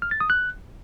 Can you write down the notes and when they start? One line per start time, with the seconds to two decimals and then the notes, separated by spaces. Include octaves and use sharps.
0.02 F6
0.11 A6
0.20 D#6
0.30 F#6